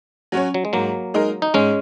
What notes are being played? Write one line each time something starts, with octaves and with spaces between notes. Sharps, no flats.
F#3 C#4 F#4 C#5
F#3
G#3
G#2 F#3 A#3
G#3 D#4 A#4
D#4
G#2 G#3 C#4